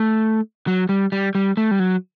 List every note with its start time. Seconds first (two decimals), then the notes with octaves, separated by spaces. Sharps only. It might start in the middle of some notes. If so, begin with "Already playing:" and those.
Already playing: A3
0.67 F#3
0.89 G3
1.12 G3
1.35 G3
1.57 A3
1.71 G3
1.79 F#3